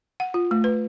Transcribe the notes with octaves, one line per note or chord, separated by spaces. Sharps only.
F#5
F4
A3
B4